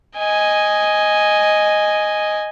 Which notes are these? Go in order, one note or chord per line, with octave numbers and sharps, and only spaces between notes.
D#5 G#5